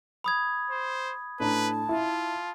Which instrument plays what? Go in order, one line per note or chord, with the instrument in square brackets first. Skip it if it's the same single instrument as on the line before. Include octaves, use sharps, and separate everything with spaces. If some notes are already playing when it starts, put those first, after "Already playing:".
[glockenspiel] B5 D#6 G#6
[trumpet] C5
[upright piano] A2 D4 A#5 [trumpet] B4 [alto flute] A5
[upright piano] E4 [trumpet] F4